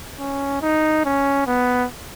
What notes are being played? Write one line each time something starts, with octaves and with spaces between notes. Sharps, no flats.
C#4
D#4
C#4
B3